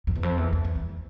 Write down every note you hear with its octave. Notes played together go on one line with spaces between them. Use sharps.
F2
E2
F2
E2
E2
E2
E2